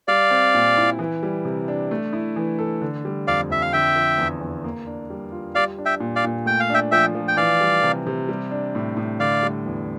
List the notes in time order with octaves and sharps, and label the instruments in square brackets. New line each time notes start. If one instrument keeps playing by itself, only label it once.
[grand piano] G3 [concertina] D5 F5
[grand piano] C4
A#2
E4
E3
G3
C3
D4
A3
E4
E3
A4
D3
G3
[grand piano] F2 [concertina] D5 F5
[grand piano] F2 [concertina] E5
[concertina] F5
[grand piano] D3 [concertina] E5 G5
[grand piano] F3
E2
E2
A#3
D4
G3
F4
[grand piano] G3 [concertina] D5 F5
[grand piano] D4
[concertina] E5 G5
[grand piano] A#2
[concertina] D5 F5
[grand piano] A#2
[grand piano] A3 [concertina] G5
[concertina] F5
[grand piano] D4 [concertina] E5 G5
[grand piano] F3 [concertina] E5 G5
[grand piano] F3
[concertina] G5
[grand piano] E3 [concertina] D5 F5
[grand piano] G3
C3
C3
G3
D4
A2
A2
[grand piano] D3 [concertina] D5 F5
[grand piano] G3
E2